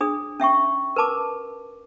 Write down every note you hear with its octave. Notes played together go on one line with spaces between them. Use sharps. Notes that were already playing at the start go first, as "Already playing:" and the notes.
D4 G#4 D#6
C#4 E5 G5 C#6
A#4 B4 A5 D6